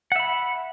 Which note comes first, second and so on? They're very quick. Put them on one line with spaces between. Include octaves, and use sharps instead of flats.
F#5 E5 B5